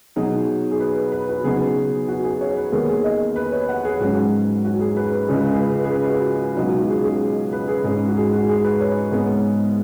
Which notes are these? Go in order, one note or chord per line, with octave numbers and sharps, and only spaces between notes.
B2 F#3 D#4 G#4
G#4
B4
B4
F#4
C#3 F#3 B3 D#4 G#4
F#4
G#4
C#5
B4
D#2 D#3 B3 G#4
G#4
D#5
B4
C#5
F#5
G#4
G#2 F#3 C#4 F#4
F#4
G#4
B4
C#2 C#3 G#3
G#4
B4
G#4
B4
F#4
C#2 B2 F#3 D#4
F#4
G#4
G#4
B4
G#4
G#2 G#3 C#4
F#4
G#4
F#4
G#4
B4
C#5
G#2 G#3 B3